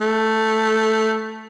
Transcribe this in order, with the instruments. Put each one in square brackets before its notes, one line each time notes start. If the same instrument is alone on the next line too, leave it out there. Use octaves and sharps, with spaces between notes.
[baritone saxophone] A3